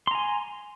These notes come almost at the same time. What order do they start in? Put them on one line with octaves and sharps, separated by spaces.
C6 A#5 G#5